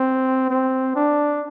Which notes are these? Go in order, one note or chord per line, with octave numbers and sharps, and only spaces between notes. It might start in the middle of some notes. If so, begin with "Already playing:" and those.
Already playing: C4
C4
D4